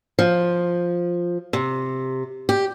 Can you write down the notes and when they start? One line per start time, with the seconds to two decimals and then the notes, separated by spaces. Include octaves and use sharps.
0.19 F3
1.53 C3
2.49 G4